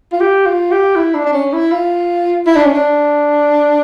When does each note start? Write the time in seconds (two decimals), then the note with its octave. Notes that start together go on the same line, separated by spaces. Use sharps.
0.12 F4
0.20 G4
0.46 F4
0.71 G4
0.95 E4
1.14 D4
1.24 D4
1.33 C#4
1.53 E4
1.71 F4
2.46 E4
2.56 D4
2.64 C#4
2.74 D4